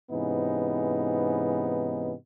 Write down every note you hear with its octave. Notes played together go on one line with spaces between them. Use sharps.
G#2 C3 E3 B3 C#4 D#4